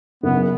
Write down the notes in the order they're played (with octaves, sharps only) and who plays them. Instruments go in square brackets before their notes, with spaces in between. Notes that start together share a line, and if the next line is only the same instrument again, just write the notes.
[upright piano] F#1 [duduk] B3